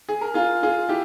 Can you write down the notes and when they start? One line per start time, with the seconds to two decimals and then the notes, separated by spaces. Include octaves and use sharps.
0.09 G#4
0.21 A#4
0.34 F4 G#4
0.63 F4 G#4
0.89 E4 G4